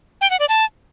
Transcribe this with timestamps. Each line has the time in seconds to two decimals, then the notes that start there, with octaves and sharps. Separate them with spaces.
0.21 G5
0.30 F#5
0.40 D5
0.49 A5